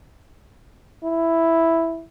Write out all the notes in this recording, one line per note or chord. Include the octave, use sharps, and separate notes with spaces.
E4